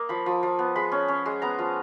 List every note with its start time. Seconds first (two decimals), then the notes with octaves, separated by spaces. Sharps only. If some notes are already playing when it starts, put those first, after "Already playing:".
Already playing: A#3 D#5
0.09 F3 B5
0.26 F3
0.43 F3
0.59 B3
0.76 G#3 B5
0.92 C#4
1.08 C#4
1.26 G#3
1.42 B3 A#5
1.59 F3